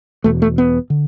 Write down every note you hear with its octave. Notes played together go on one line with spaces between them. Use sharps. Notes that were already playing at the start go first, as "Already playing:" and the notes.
E1 E2 B2 A3
A3
B3
D3